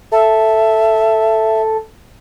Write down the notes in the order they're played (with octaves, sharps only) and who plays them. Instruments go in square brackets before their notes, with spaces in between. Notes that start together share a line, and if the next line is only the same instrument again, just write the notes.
[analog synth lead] A4 [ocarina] E5